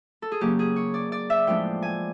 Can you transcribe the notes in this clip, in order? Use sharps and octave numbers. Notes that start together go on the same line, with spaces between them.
A4
G#4
C#3 F#3 A#3 C#4 G4
G#4
C#5
D5
D5
E5
A2 F3 G#3 B3 D4 G5
G#5